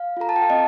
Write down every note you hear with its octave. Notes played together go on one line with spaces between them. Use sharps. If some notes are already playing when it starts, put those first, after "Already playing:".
Already playing: F5
F4 A4 A#5
A5
G5
F5
C4 D#5